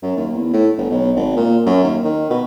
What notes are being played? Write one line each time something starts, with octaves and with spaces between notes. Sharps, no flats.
F#2
D#2
E2
A2
G1
B1
G#1
A#2
F#2
D#2
D#3
B2